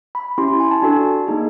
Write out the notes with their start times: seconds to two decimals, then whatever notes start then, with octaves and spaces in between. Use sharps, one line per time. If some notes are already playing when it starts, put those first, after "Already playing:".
0.15 B5
0.38 C#4 E4 G4 C6
0.48 C6
0.60 G#5
0.71 A5
0.82 D4 F#4 A4
1.27 A#3 D#4 G#4